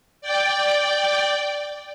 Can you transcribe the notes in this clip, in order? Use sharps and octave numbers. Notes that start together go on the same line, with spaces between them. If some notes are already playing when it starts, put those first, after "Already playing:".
D5 G5